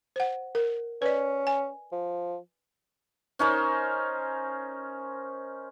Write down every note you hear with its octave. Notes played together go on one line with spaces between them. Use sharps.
C5 F#5
A#4
C#4 B4 D5
G#5
F3
C#4 D#4 A#4 C5